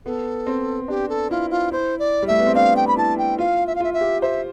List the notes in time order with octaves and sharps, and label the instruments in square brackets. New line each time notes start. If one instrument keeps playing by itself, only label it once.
[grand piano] B3 [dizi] A4
[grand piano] C4
[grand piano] D4 [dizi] G4
[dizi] A4
[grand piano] E4 [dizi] F4
[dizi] F4
[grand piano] E4 [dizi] C5
[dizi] D5
[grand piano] G3
[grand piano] A3 [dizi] E5
[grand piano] B3
C4
[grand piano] D4 [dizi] F5
[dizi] G5
B5
[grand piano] E4 [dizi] A5
[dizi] G5
[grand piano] F4 [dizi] F5
[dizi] E5
F5
[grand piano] F4 [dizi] E5
[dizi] E5
[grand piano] G4
[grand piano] C5 [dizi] E5